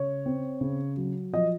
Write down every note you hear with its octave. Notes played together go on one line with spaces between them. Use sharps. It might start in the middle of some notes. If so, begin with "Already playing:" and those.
Already playing: C#3 C#5
C4
C#3
F#3
F3 D#5